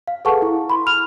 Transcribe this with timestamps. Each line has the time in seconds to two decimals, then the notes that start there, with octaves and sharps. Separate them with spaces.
0.08 F5
0.25 G#4 A4 B4 F#5 A5 C#6
0.42 E4
0.70 B5 C6
0.87 F6 F7